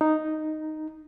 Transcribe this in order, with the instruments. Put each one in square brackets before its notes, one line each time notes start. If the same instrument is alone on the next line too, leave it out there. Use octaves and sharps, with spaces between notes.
[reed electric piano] D#4